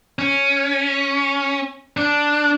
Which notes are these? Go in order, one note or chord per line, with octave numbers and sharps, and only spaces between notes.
C#4
D4